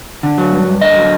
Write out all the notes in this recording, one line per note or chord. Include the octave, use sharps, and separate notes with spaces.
D3
F#3
G2
G2
D3 D#5
F#3